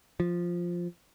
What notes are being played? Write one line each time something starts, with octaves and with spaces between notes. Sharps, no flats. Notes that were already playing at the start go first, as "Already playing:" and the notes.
F3